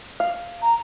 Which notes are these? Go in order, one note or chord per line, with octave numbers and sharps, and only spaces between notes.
F5
A#5